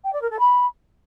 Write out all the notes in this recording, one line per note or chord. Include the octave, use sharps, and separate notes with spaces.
G5
D5
A#4
A4
B5